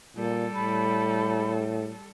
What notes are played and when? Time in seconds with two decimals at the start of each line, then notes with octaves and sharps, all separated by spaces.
0.16 A#2 G3 A4
0.54 A2 B5